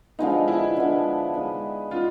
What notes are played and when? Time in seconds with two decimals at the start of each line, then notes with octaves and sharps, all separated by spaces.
0.19 D3 F3 G#3 B3 D#4
0.48 E4
0.76 D3 F3 G#3 B3
1.34 G#3 B3 D#4
1.91 G#3 B3 D#4 F4